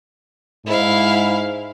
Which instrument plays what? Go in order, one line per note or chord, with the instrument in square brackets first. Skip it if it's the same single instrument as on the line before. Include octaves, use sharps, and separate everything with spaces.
[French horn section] G#2 [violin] E4 F5